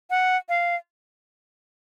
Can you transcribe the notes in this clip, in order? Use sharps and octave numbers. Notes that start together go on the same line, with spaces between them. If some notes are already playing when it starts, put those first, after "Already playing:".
F#5
F5